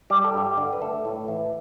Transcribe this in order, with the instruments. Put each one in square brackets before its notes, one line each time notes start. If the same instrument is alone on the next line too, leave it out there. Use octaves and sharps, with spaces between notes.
[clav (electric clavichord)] G3 G4
A4
G2 G4
D3
B4
A3 A4
A2
E3